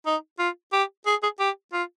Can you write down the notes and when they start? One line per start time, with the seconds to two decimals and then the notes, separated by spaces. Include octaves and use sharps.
0.06 D#4
0.39 F4
0.73 G4
1.06 G#4
1.23 G#4
1.40 G4
1.73 F4